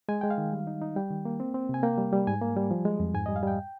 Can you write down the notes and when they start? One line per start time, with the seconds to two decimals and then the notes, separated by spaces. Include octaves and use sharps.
0.09 G#3 G#5
0.21 G#3 G5
0.30 F5
0.38 D#3
0.53 G3
0.67 D#4
0.81 D#4
0.96 G3 G5
1.11 D#3
1.25 A#3
1.40 C4
1.54 C4
1.69 C3 G#5
1.83 A#3 G5
1.98 G3
2.12 G3
2.27 G#2 G#5
2.41 A#3
2.57 G3
2.71 F3
2.85 G#3
3.00 F2
3.14 G#2 G#5
3.26 G3 D#5
3.36 F5
3.43 G3 G5